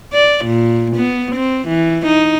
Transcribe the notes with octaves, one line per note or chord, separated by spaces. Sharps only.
D5
A#2
B3
C4
E3
D#4